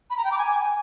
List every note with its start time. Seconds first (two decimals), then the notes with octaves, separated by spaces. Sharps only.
0.10 B5
0.17 A#5
0.24 G5
0.31 D6
0.39 G#5